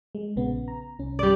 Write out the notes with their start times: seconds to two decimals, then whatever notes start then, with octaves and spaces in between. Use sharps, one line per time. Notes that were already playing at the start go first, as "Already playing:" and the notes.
0.15 G#3
0.36 A#1 C#3 B3
0.68 A#5
0.99 C2 C#4
1.19 G3 D5